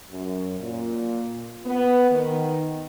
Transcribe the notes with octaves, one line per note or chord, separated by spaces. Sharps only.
F#2
A#2
B3
D#3